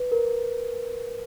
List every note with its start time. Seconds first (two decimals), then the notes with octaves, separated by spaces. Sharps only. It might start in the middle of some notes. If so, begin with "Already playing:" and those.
Already playing: B4
0.12 A#4